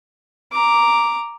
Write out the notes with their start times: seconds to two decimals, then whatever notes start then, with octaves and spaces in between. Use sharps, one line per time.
0.52 A#5 D6